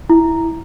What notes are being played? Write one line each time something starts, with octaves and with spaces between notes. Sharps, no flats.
E4